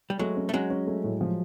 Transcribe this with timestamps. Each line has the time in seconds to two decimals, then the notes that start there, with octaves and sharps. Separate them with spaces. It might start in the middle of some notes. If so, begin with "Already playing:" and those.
0.10 G3
0.19 F#3 G#3 A3
0.36 C#4
0.49 A3
0.53 F#3 G#3 C#4
0.70 C#4
0.87 A3
1.04 A2
1.21 F3